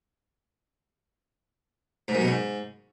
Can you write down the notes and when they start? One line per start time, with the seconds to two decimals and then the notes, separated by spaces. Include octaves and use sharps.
2.08 G#2
2.15 F#2
2.21 B2
2.28 G#2